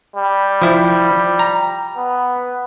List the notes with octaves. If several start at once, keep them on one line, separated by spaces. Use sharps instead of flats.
G3
F3 E4
A#5
B3